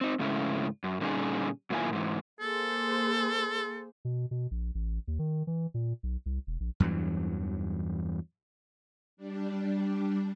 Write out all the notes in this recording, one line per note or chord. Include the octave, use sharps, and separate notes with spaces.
C4 D#4
G#2 C#3 G#3 A3 C#4 E4
F#2
A#2 D3 G3 C#4 D#4 G#4
F#2 A#2 D#3 E4 F4 G#5
G#2 E3
A#3 G#4 A4 C5
B2
B2
A#1
A1
D#2
D#3
E3
A#2
B1
C2
E1
A#1
E2 G2 E3 F#3
G3 D4